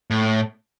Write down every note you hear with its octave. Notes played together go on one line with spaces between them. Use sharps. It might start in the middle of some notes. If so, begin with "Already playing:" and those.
A2